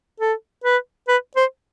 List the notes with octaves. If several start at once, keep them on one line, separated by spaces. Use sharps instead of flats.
A4
B4
B4
C5